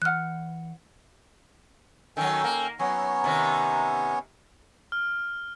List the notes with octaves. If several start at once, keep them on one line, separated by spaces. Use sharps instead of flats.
E3 F#5 F6 F#6
D#3 F#3 C#4 A4 G5
A#3
F#3 B3 C#4 C#5
C3 D#3
F6